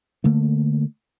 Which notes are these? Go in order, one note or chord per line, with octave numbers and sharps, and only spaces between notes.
D3 A3 A#3